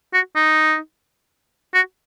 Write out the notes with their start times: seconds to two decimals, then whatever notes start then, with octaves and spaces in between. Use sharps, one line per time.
0.13 F#4
0.36 D#4
1.74 F#4